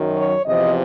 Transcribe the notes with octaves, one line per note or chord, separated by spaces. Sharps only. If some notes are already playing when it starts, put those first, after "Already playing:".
Already playing: F#2 D#3 F#3
C#5
E2 C3 F3 D#5